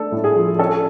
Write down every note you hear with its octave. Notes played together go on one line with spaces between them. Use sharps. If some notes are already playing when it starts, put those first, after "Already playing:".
Already playing: A3 D4 A4
A2
G#4
F3
C#4 A4